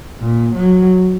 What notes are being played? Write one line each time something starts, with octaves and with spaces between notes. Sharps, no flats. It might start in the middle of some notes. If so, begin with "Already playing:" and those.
A#2
F#3